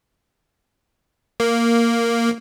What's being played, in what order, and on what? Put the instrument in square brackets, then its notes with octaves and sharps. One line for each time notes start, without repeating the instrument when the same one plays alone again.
[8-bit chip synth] A#3